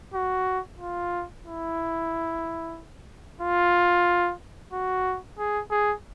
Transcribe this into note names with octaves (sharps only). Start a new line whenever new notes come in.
F#4
F4
E4
F4
F#4
G#4
G#4